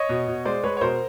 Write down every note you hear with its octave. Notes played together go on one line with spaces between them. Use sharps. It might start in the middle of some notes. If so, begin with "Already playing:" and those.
Already playing: C#5 D#5
B2
B2
G#3 C5 D5
G#3 B4 C#5
C#5
B2 A#4 C5